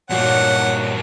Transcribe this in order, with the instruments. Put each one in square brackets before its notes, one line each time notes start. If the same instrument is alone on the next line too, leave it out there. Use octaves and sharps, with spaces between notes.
[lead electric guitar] G2 A#3 [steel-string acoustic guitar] A#2 F#4 A5 [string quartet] D#4 C#5 [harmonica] F#5